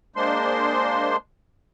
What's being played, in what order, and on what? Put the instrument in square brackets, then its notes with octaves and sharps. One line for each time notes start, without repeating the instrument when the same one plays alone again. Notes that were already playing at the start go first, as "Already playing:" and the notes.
[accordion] G#3 A#3 D4 C5 C6